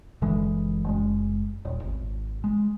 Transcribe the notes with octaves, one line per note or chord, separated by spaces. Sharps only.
F#1 D3 E3 G#3
F#1 G#3
D#1
G#1
G#3